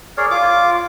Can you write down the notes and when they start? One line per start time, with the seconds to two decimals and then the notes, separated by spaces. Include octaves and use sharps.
0.17 G#4 A#4 C#5 D5
0.31 F4 D6